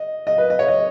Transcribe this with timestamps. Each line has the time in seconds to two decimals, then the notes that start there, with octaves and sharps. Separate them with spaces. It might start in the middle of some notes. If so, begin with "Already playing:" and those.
Already playing: D#5
0.27 D#5
0.38 B4
0.50 D#5
0.59 C#5
0.68 D#5